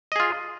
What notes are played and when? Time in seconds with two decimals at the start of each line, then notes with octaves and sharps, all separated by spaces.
0.12 D#5
0.16 G#4
0.20 F4